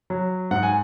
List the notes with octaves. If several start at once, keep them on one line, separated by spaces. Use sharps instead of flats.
F#3
G#2 F#5
G#5